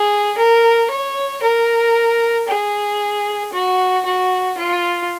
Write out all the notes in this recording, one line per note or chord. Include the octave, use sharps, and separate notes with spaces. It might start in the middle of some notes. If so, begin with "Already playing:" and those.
Already playing: G#4
A#4
C#5
A#4
G#4
F#4
F#4
F4